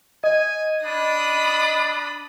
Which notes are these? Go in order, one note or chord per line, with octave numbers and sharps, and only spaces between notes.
D#5 G#5
D4 B5 D#6